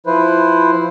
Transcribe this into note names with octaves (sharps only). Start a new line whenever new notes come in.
F3 E4 B4 C5